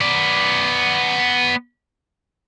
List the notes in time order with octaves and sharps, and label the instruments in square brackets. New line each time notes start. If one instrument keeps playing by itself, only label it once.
[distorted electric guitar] B3 D5